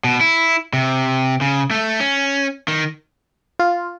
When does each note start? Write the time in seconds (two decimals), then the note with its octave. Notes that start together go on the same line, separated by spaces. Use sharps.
0.04 B2
0.21 E4
0.73 C3
1.41 C#3
1.71 A3
2.00 C#4
2.68 D#3
3.59 F4